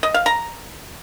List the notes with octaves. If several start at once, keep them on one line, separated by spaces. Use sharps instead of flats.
D#5
F5
A#5